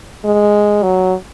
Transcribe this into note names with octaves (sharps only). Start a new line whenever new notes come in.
G#3
F#3